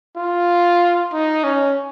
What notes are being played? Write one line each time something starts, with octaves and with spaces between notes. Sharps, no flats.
F4
D#4
C#4